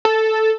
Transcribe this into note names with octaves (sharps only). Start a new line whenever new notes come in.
A4